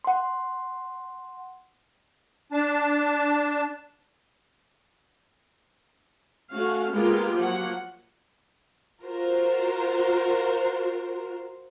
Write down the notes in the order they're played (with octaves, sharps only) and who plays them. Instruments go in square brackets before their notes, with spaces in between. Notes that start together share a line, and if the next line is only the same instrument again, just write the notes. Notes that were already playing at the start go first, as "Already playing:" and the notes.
[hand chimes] F#5 C6
[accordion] D4 A5
[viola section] A3 C#4 F#4 F5
G#3 A#3 B3 F4 G4 A#4
F3 F#3 A#3 F#5
[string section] F4 F#4 A#4 C5